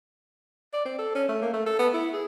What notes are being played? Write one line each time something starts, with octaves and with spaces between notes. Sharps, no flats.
D5
C4
A4
C#4
A3
A#3
A3
A4
B3
E4
G#4